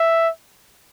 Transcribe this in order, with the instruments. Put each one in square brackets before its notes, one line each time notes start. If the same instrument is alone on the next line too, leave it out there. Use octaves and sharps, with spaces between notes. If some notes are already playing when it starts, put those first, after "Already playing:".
Already playing: [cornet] E5